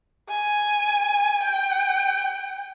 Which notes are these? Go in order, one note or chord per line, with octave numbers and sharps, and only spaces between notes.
G#5
G5